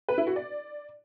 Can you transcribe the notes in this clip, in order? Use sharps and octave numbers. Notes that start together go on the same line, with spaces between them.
B4
E4
F#4
D5